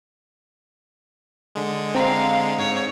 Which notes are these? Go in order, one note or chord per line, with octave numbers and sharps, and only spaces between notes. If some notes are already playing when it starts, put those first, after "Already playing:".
D3 G#3
C4 F5 A#5
G#2 C#5